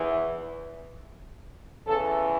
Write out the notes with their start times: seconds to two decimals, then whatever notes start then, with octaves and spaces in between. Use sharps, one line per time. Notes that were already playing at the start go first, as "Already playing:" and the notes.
Already playing: E2 E3
1.86 E2 C#3 E3 A4